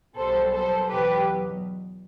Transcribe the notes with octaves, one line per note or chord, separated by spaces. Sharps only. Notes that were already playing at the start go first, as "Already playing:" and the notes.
B1 B2 G3 B3 A4 C5
A4 C5
E2 B2 F#3 G4 B4